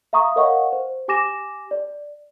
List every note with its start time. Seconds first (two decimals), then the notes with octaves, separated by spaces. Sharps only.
0.13 E5 F5 A#5 C#6 D#6
0.36 A#4 C#5 D#5 F5 F#5 C#6
0.73 C5
1.08 G4 G#5 D6 A#6 E7
1.71 D5